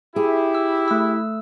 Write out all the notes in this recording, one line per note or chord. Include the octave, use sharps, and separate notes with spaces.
E4 G4 G#4
E6
A3 E6